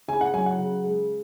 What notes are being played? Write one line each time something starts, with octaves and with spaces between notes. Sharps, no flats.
C#3 G#5
F#5
F#3 G#5
F#5
C#3
G#3